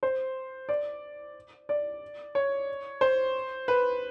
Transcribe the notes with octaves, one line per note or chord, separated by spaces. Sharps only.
C5
D5
D5
C#5
C5
B4